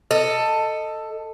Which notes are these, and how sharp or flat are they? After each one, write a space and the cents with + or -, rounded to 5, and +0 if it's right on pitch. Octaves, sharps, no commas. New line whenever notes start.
A4 +10 D#5 +0